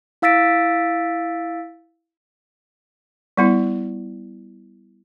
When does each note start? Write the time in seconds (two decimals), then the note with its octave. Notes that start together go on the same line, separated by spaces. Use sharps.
0.22 E4 F5 E6 A6 B6 D7
3.37 G3 B3 E4